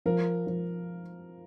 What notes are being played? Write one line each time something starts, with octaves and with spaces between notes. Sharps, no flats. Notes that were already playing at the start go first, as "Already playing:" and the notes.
F3 A#4
F3